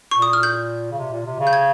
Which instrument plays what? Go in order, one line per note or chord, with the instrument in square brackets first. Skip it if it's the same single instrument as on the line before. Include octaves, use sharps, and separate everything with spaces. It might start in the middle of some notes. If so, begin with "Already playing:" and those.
[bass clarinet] A#2 [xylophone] C#6
[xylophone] D#6
F6
G6
[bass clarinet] C#3
C3
A#2
C3
C#3
[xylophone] G6
G#6